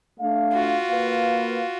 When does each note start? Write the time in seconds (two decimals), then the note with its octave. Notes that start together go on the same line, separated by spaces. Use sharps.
0.20 A3 D4 F5
0.53 F4 F#4
0.89 A#3 B4 F5